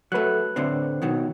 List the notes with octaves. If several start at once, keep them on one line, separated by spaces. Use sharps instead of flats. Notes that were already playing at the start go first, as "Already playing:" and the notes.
F#3 A3 B4 F#6
A2 D3 C4
B2 D#3 F#3